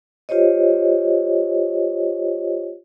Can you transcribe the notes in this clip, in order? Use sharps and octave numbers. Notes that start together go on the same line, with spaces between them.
F4 G4 C5 C#5 D#5